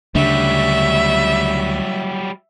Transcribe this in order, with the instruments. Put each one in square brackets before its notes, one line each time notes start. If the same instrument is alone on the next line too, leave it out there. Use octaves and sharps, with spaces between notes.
[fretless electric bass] D2 C#3 D4 [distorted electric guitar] F#3 G3 [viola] E5